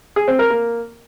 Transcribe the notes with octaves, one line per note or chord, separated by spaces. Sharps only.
G#4
C4
A#4
A#3